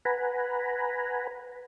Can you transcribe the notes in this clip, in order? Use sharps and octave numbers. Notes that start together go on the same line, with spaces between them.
B4 F#5 G#5 A#5 B5